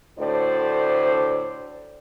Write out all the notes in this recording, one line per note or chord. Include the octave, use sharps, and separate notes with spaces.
D2 A2 A4 C5 D5